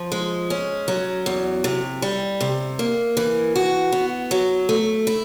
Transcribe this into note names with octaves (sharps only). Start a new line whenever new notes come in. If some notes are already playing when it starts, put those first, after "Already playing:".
Already playing: F3
G#3
C#4
F#3
E2
C3
G3
C3
A#3
E3
F#4
B3
F#3
A3
E4